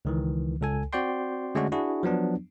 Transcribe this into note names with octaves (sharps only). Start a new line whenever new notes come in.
C#2 D#3 E3
C#2 A4 G#5
C4 F#4 C5 D5 G5 C6
D3 G#3 A3 C#4 D4 F#4
D4 E4 F#4 G#4
F3 F#3 B3 D4